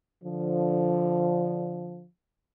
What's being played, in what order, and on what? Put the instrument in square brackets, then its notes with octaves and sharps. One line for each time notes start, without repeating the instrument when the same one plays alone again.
[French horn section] D3 F3